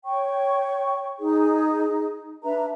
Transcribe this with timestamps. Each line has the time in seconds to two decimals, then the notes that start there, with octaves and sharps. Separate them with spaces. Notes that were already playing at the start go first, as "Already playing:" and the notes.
0.05 C#5 G5 C#6
1.19 D#4 G#4
2.44 D4 B4 E5 A#5